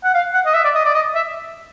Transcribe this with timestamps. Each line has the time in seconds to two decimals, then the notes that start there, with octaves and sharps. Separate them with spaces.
0.04 F#5
0.14 F5
0.34 F#5
0.46 D#5
0.54 E5
0.64 D5
0.75 D#5
0.85 D5
0.95 D#5
1.15 E5